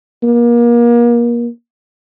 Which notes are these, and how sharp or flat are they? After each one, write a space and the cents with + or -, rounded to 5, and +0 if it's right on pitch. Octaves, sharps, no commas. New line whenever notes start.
A#3 +30